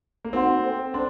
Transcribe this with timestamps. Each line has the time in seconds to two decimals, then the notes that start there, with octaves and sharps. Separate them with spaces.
0.25 A#3
0.33 C4 D#4 F#4 C5 F#5 C6
0.64 A4 C5 G5
0.94 D4 C5 C6